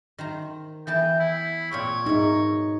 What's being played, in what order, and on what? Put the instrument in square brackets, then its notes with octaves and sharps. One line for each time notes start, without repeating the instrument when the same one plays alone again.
[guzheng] D#3 C5 A#5
[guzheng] E3 B3 A5 [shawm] G5
[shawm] E4
[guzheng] A#2 C4 G5 [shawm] C#5
[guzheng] G#2 B2 [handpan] D#4